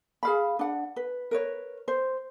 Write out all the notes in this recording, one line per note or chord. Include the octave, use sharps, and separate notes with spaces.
G#4 F5 B5
D4 F#5
B4
A#4 B4 C#5
C5